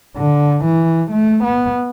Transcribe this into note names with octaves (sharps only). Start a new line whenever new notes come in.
D3
E3
A3
B3